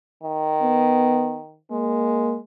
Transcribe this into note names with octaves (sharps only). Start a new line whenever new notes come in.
D#3
B3
G#3 A#3